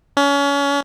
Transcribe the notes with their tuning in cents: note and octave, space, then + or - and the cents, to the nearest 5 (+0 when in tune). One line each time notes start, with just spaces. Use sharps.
C#4 +30